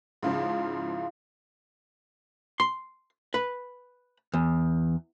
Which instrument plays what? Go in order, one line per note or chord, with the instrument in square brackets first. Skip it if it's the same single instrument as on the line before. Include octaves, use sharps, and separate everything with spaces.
[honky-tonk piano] G#2 C#3 F3 [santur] E4 F4
[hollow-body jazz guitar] C6
B4
E2